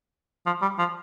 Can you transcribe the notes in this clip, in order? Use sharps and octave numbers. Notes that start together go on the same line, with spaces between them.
F3
G3
F3